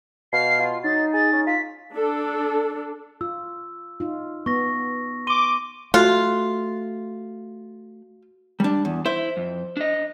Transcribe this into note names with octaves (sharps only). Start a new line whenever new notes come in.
B2 F5 C7
F4
F#3 D#4 A6
G#4 A6
C#4
F4 B6
D4 A4
F4 E6
D#4 F4
B3 C#6 A#6
C6 D6 D#7 G7
A3 F4 F#4
G3 D4
E2
E4 C5
F2
D4 D#5